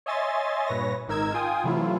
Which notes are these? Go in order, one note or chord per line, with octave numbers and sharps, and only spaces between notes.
C#5 D#5 E5 G#5 C6 A6
G2 A#2 B4 C#5 A#6
G#1 G#2 D#4 A#4 E6 G#6
F4 G5 G#5 D#6
C3 E3 F#3 A3 E4 F4